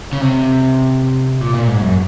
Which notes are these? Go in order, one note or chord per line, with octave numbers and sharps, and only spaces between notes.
C#3
C3
A#2
A#2
G#2
F#2